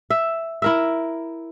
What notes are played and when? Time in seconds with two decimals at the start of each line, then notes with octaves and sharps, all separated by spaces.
0.10 E5
0.62 E4 A#4 E5